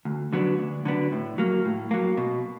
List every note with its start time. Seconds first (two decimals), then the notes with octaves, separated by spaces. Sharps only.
0.05 D2
0.33 D3 F#3 B3 D4
0.58 D2
0.85 D3 F#3 B3 D4
1.12 A2
1.38 F#3 A#3
1.65 A2
1.91 F#3 A#3
2.17 B2